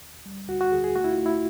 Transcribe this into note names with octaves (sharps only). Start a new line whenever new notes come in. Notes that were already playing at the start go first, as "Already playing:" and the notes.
D2
G3
D2 F#4
F#4
D2 G#4
G#4
A3 F#4
E4
F4
A3
E4